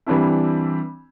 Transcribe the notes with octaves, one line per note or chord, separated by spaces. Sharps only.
E3 G3 C4 D4 E4